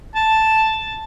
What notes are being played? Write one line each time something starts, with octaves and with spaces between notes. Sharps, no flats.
A5